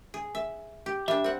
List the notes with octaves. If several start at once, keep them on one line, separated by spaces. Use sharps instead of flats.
G#4
E5
G4
G3 D4 E5
C4 F#5